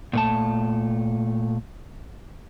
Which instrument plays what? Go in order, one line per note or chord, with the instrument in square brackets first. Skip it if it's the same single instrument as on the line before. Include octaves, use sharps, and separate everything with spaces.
[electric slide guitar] A#2 A3 A5